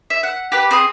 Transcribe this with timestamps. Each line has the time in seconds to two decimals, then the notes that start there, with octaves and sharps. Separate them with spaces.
0.10 E5
0.23 F#5
0.52 G4 B4
0.71 C4 G#4 D#6